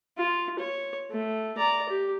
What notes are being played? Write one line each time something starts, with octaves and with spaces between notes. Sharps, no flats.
F4
C#5
A3
D5 A#5
G4